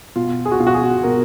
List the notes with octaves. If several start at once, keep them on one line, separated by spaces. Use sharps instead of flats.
B2 F4
G#4
F#4
B2 F4
F#4
G#4
B2 A#4